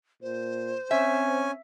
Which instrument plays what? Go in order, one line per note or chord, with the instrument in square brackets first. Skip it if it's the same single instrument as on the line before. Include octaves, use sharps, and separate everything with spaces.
[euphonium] A#2 [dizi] C5
[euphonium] C4 [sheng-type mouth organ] C#4 G#5 [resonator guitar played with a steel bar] E5